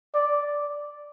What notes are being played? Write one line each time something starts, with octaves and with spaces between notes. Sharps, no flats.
D5